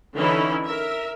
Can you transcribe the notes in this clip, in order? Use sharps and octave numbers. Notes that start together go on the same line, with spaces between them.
D3 E3 C#4 D#4 E4
A#4 E5